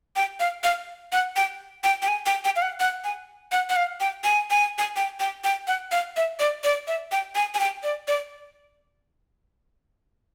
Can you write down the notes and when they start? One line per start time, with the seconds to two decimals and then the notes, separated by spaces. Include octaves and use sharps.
0.16 G5
0.40 F5
0.64 F5
1.12 F#5
1.36 G5
1.84 G5
2.02 G5
2.08 G#5
2.26 G5
2.45 G5
2.56 F5
2.62 F#5
2.80 F#5
3.04 G#5
3.52 F#5
3.70 F#5
3.76 F5
4.00 G5
4.24 G#5
4.50 G#5
4.78 G#5
4.96 G5
5.20 G5
5.44 G5
5.68 F#5
5.92 F5
6.17 E5
6.40 D5
6.64 D5
6.87 E5
7.12 G5
7.35 G#5
7.54 G#5
7.60 G5
7.83 D5
8.08 D5